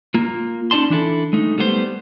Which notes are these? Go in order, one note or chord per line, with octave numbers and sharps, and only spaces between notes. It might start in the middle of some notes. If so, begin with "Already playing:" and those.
A#3 F4
C#4 D#4 D5 A5 C6
E3 D4 E4 A4
G#3 A3 D#4
G3 A3 B3 E4 C5